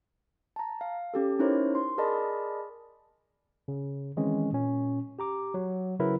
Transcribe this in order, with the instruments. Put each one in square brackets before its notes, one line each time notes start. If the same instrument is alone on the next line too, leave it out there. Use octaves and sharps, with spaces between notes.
[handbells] A5 A#5
F5
C#4 G4 A4
C#4 D#4 E4 A#4 C5 C#5
C6
G#4 A#4 D5 D#5 A5 B5
[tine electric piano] C#3
D#3 E3 G#3 C4 C#4
A#2 C#4
G4 A#5 D6
F#3
C#3 F#3 E4 A#4 B4